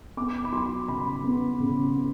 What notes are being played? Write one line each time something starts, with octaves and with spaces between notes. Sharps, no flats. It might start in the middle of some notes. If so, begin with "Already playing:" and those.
B3 D6
B5
F#3 C6
C#3 B5
B3
C#3
B3